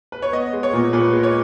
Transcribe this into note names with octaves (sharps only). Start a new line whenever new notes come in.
B4
C#5
B3 D#5
G#3
C#5
A#2
A#2 B4
G#3
C#5